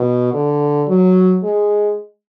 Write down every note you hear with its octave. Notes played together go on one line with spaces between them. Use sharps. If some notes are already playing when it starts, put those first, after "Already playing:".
Already playing: B2
D3
F#3
G#3